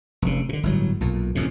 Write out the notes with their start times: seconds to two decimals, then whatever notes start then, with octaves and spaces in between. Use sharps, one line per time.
0.22 F1 C#3
0.49 A#2 D3
0.63 G1 A2 F#3
1.01 B1 A#2
1.35 A1 F2 C3